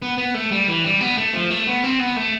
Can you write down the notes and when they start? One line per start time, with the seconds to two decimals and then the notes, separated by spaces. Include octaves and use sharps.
0.02 B3
0.18 B3
0.34 A3
0.52 G3
0.68 E3
0.84 G3
1.01 B3
1.18 A3
1.34 F3
1.50 A3
1.67 B3
1.84 C4
2.00 B3
2.17 A3